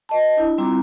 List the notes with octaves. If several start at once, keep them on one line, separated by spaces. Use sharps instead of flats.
B4 D#5 A5
D4 E4
G3 C4 E4 F4 A#5 D6